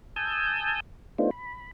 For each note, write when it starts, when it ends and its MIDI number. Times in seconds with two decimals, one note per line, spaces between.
0.16 0.80 80
0.16 0.80 81
0.16 0.80 87
0.16 0.80 88
0.16 0.80 91
1.18 1.30 57
1.18 1.30 59
1.18 1.30 62
1.18 1.30 63
1.18 1.30 65
1.18 1.30 72
1.31 1.71 83